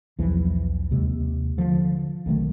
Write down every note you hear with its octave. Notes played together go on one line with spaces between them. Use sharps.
B1 E2 E3 F3
D#2 C3 G#3
D3 F3
B1 D#3 G3 A3